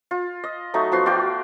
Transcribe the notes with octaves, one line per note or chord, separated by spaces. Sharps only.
F4
D#5
F#3 A3 D#4
F3 B3 F#4 C6
F4 F#4 D5 G5